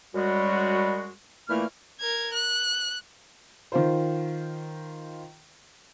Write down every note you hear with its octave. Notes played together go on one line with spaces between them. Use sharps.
F#2 G3 G#3 F#4
A#2 E3 A3 A#3 E4 F6
A#4 G#6
F#6
D#3 F4 C5